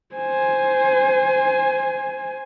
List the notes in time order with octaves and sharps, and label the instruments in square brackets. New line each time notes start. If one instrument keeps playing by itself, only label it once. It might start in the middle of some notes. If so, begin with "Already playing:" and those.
[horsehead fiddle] C5 G#5